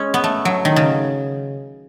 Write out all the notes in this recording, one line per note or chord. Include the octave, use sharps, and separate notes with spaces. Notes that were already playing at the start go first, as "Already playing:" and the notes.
Already playing: G#3 C#4
B3
A3
F#3
D#3
C#3